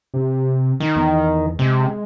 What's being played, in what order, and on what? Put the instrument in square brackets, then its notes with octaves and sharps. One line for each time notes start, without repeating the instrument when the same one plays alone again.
[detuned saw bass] C3
[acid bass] D#3
[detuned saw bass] E2
[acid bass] C3 [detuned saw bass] G#3